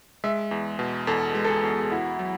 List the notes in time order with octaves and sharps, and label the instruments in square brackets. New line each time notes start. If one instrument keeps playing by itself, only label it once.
[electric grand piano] G#3 [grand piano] E5
[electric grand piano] E2
B2
[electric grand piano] E2 [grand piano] A4
[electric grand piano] G#3
[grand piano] A4
G#4
[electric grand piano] E2
[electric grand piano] E4 [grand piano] F#4
[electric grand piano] F#3